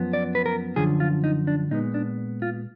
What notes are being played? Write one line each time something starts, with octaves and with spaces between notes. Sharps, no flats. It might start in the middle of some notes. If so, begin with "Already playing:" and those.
Already playing: F#2 F3 B3
D5
B4
A#4
F#2 D3 F3 G#4
F4
D#4
D4
A#2 G#3 B3 D#4
D4
F4